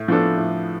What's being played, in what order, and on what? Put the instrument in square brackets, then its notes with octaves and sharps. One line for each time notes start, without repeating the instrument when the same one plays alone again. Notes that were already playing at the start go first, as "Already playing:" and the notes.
Already playing: [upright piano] A2
F3 B3 D4 A4
A2